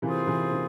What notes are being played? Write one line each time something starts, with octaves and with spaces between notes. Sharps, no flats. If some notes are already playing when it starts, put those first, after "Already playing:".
C3 E3 A#3 F4 G#4 C5
C3 E3
C3